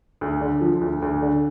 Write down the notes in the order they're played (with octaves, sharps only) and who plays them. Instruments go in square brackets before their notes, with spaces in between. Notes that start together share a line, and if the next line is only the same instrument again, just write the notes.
[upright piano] D2
D3
F3
D2
D2
D3